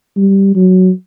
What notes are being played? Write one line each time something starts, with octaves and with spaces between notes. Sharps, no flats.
G3
F#3